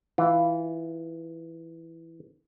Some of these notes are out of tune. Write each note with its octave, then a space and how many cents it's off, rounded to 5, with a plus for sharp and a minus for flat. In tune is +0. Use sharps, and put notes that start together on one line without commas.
E3 +0 F4 -15